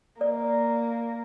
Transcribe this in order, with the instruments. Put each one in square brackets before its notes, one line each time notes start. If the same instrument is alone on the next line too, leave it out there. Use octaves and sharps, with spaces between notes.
[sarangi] A#3 [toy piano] D5